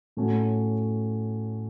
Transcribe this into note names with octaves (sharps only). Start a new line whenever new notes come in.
A2 A3 C#4 F#4